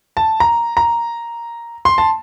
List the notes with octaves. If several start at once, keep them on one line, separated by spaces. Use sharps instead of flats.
A5
A#5
A#5
C6
A5